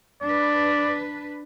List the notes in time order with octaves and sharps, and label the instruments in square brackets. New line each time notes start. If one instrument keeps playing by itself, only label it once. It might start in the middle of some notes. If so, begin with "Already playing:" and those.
[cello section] D4 B4 [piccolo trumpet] D5